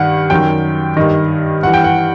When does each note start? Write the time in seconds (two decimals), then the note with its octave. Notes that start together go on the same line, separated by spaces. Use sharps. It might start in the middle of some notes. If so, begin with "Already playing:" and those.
Already playing: G2 D#3 F#5
0.30 F#2 D#3 G5
0.97 G2 D#3 D#5
1.63 G2 E3 F#5
1.74 G5
1.84 F#5